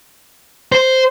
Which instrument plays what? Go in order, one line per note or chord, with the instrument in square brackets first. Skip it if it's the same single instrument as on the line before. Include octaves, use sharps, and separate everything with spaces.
[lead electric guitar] C5